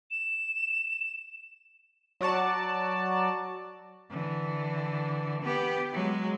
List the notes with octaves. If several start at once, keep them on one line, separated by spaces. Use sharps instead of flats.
E7
F#3 F#4 D5 A5
D3 E3
B3 G4
F#3 G#3